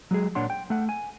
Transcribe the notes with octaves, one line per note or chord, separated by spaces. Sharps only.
F#3 G#3 G#4
A#2 D4 C#5 F#5 C6
G5
A3 F#5
G#5